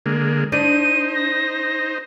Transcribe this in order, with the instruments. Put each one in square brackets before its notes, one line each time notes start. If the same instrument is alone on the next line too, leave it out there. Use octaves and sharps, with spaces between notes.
[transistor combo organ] D3 G#3 A#3
[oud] D4 [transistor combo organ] D#4 C5 [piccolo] D#7
[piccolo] A#6